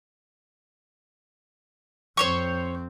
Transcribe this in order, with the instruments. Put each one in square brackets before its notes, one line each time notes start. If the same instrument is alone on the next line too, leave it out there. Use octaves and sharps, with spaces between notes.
[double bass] F2 C4 [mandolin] C5 C#5 C#6